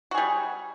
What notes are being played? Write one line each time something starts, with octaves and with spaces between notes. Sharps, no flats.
G3 F#4 G#4